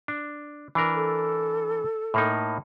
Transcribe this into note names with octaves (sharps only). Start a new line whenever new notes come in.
D4
E3 D4 A#4
A4
A2 A#3 D#4